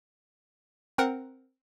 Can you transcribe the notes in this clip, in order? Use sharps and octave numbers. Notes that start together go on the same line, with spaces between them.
C4 A#4 F#5